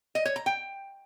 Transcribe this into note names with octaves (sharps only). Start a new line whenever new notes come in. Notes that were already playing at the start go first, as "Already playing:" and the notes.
D#5
C#5
A#5
G5